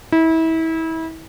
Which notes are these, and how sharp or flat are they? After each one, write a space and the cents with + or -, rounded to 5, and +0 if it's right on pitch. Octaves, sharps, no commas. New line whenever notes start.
E4 -30